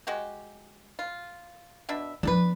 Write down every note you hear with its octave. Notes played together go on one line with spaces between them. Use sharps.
G#3 F#4 G4
F4
B2 D4 E5
F3 B3 D4 A4 B4